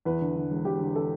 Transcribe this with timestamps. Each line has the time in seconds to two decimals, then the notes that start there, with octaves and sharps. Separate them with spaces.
0.05 E2 B4
0.21 D3
0.36 D3
0.51 E1
0.65 E1 G4
0.80 D3
0.96 A4